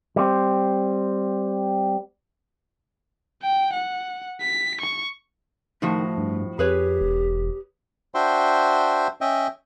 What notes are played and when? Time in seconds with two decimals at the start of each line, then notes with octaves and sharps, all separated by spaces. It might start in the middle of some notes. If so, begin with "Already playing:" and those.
0.16 G3 C4
3.42 G5
3.73 F#5
4.41 B6
4.81 C#6
5.82 A2 D#3 F3 A3 F#4
6.18 G2
6.59 F2 G4 G#4 B4 C#5
7.01 E1
8.15 D4 F#4 C5 E5 G5 C6
9.21 C#4 D#5 E5 G5